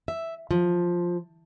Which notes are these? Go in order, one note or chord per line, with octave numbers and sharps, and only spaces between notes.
E5
F3